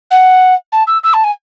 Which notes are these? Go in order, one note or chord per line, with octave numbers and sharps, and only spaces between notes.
F#5
A5
E6
E6
A5
G#5